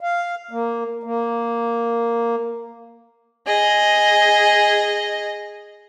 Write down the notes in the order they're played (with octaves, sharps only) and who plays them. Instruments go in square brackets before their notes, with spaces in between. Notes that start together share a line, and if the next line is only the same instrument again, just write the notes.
[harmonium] F5
A#3
A#3
[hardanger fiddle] G#4 D#5